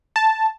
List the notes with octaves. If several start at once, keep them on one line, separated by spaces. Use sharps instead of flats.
A5